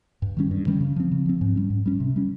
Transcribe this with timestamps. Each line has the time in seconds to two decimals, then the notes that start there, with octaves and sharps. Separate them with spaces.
0.22 G2
0.37 D#3 G3 C#4
0.51 G2
0.67 D#3 G3 C#4
0.81 C#3
0.96 F3 C4
1.11 C#3
1.26 F3 C4
1.41 G#2
1.56 G3 C#4
1.70 G#2
1.86 G3 C#4
2.00 C3
2.16 G3 C#4